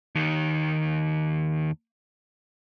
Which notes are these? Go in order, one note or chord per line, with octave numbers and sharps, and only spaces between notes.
D#2 D#3